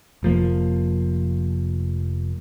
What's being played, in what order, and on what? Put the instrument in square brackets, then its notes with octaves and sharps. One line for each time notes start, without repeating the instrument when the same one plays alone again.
[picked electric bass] F1 F3 A#3